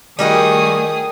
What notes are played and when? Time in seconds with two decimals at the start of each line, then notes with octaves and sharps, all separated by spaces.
0.19 D#3 G3 A3 D#4 F#4 G#4 D#6